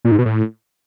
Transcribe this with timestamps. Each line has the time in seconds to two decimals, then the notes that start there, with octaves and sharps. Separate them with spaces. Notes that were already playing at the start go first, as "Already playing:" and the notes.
0.05 A#2
0.12 G#2
0.19 B2
0.26 A2